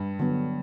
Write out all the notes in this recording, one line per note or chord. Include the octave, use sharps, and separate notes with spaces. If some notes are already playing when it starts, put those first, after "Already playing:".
Already playing: G2
D3 F#3 B3